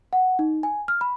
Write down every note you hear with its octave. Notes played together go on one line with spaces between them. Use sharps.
F#5
D#4
G#5
F6
B5